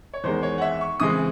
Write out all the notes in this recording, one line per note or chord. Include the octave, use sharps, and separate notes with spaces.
C#5
E2 D#3 G#3 C5
C#5
F#5
E5
C#6
C#3 E3 G#3 C4 D#6